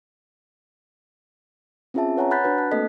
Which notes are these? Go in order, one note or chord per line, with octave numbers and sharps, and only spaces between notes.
C4 C#4 F4 G#4 E5 A5
B4 C#5 F#5 G#5 A#5
F#5 B5 F#6 G6 A6 B6
D4 F#4 B4
A5 F#6
A3 A#3 C4 A4 D#5 B6